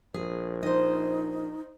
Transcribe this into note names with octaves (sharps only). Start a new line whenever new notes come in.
A#1 G#4
D#4 C5 D#5